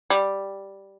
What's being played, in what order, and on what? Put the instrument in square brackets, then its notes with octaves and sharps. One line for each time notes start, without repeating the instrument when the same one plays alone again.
[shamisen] G3